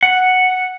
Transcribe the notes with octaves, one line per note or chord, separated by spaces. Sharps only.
F#5